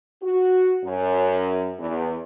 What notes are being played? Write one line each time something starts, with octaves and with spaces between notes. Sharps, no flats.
F#4
F#2
E2